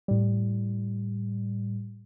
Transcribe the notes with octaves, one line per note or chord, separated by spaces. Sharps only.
A2 G3